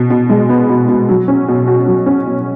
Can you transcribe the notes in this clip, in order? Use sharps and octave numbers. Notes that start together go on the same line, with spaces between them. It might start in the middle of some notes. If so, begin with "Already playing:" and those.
Already playing: B2
B2
G#3
B3
B2
B2
F#3
C#4
B2
F#4
F#3
C#4
B2